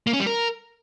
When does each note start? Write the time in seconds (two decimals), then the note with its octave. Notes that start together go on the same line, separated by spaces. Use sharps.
0.07 A#3
0.13 C#4
0.20 G3
0.26 A#4